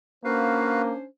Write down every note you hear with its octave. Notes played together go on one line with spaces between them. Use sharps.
A#3 C#4 D4 F#4 B4 C5 F5